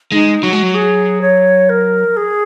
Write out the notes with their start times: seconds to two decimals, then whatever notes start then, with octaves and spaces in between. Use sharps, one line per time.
0.12 G#3 D#4
0.43 F#3 F#4
0.53 G#3
0.62 F#3
0.75 G#4
1.21 C#5
1.69 A#4
2.17 G#4